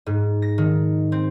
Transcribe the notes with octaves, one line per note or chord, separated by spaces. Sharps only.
G#2
A#6
D#3
C4